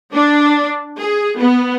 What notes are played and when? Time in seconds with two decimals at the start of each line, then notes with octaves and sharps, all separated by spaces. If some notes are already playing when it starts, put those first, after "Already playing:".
0.13 D4
0.99 G#4
1.39 B3